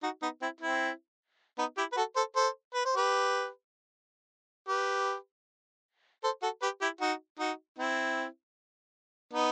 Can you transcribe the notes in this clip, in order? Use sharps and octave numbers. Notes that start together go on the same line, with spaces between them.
D#4 F#4
B3 D#4
C4 E4
C4 E4
B3 D#4
E4 G4
B4
F#4 A4
A4 C5
A4 C5
B4
C5
G4 B4
G4 B4
A4 C5
F#4 A4
G4 B4
E4 G4
D#4 F#4
D#4 F#4
C4 E4
B3 D#4